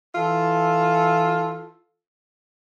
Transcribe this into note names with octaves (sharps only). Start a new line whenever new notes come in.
E3 F4 A4